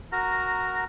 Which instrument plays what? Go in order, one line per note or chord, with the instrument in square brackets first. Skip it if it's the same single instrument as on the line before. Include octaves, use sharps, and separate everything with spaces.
[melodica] F#4 A#4 A#5